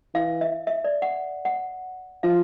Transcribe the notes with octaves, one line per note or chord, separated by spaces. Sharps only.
E3 F5
E5
E5
D5
F#5
F#5
F3 F5